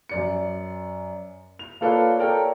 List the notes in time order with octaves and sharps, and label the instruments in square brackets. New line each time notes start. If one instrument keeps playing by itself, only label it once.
[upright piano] F#2 D5 C#7
F7
A#3 F4 A4 B4 C#5 D5
A4 A#4 C#5 D5 G5